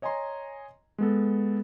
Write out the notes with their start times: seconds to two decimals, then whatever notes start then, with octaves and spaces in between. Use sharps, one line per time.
0.02 C#5 D#5 G#5 A#5 C6
0.98 G#3 B3 A4